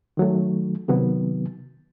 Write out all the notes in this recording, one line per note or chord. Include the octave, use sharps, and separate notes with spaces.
D#3 F#3 A3
C3 D#3 F#3 B3